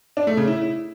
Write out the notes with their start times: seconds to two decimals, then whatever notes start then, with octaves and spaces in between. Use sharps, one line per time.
0.17 D4
0.27 A3
0.37 C#3
0.47 E4